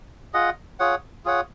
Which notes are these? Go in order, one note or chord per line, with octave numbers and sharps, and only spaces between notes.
F4 G#4 D#5 F#5
F4 G#4 C#5 F#5
F4 G#4 C#5 F#5